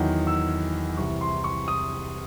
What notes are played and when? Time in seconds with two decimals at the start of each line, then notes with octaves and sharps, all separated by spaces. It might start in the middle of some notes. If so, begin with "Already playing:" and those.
Already playing: E2 D#3 F#3
0.27 E6
0.97 C2 C3 E3 C#6
1.21 C6
1.44 C#6
1.68 D#6